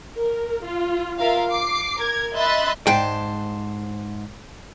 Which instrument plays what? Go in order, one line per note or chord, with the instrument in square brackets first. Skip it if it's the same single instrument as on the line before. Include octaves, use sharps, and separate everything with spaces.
[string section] A#4
F4
F4 A#4 E5 F5
D6 C7
A#4 G#6
D#5 E5 B5 C6 F#6 A6
[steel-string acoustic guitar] G#2 C5 A5 [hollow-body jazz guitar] G5